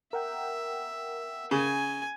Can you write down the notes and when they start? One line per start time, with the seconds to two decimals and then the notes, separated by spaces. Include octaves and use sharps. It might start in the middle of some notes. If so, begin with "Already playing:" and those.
0.13 A#4 E5 F#5 G5
1.51 C#3 G#5